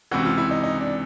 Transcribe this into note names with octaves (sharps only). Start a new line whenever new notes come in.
C#2 C3 E3 F#4
F4
E4
D#4
D#4
D4